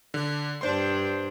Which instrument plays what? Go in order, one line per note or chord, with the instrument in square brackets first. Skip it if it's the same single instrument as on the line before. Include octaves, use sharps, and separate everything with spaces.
[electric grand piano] D3
[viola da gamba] G2 D4 [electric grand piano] C5 C6